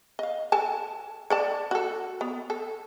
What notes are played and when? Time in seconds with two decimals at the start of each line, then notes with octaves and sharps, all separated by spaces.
0.19 D#5 F5
0.52 A4 G#5 A5
1.30 A4 D5 A5
1.71 F#4 A4
2.21 B3
2.50 A4